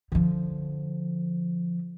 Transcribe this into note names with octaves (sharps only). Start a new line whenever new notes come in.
D3 F3